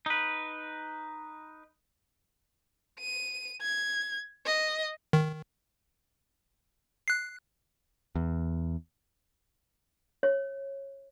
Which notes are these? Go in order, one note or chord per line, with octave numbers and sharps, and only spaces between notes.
D#4 B4
D#7
G#6
D#5
D#3
F#6 C7
E2
C#5